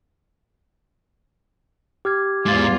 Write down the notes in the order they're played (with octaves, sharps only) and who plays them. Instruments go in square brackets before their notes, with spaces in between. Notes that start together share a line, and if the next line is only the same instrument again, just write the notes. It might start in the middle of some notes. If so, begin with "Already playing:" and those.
[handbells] G4 [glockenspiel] D6 F6 G#6
[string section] E2 F4 [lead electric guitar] G#2 [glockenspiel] D6 A6